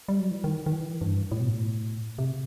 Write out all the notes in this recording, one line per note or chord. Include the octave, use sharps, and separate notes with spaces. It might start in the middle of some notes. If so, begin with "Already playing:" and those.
G3
F#3
E3
D#3
D#3
E3
G2
A2
B2
A2
C3